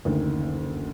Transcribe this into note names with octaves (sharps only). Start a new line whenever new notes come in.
F#1 D2 D#3